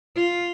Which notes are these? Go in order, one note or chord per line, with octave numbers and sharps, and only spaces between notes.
F4